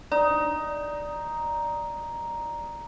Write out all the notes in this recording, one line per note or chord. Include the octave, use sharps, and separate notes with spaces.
D#4 D5